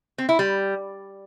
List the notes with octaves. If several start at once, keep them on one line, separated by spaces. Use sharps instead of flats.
C4
E4
G3